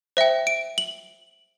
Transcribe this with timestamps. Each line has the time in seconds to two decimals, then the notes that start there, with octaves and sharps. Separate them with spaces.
0.17 C5 E5 G5
0.47 D7
0.78 F#7